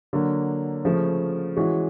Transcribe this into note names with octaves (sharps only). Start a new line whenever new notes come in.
D3 F#3 A#3
C#3 F3 A3
E3 G#3 C#4 F#4